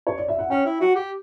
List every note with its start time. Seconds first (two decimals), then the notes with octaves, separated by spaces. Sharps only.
0.07 C#5
0.18 D5
0.28 E5
0.39 F#5
0.50 C#4 G5
0.65 E4
0.81 F#4
0.95 G4